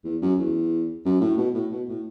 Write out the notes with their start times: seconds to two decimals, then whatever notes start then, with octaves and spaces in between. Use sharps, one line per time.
0.04 E2
0.22 F#2
0.39 E2
1.05 F#2
1.21 A2
1.38 B2
1.54 A2
1.71 B2
1.89 A2